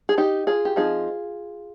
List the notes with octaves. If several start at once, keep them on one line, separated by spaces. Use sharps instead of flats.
G#4
D#4 G4
F4 G#4
G4
F3 C4 D#4 F4 G#4